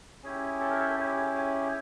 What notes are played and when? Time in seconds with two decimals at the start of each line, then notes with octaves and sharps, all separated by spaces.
0.23 C#4 E4 G4 G#4
0.61 A4
0.70 A#4
0.80 A4
0.97 C#4 E4 G4 G#4
1.16 G#4
1.35 G#4